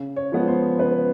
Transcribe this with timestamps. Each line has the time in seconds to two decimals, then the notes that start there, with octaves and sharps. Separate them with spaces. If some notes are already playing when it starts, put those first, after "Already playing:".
Already playing: C#3
0.16 C#5
0.32 F3 G#3 B3
0.48 C5
0.79 C#3 B4